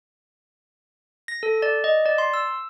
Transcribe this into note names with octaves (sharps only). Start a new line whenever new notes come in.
A#6
A4
D5
D#5
D5
C6
E6